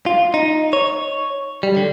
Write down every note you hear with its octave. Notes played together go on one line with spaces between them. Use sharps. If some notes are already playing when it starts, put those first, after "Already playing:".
F4
D#4
C#5
G3
D3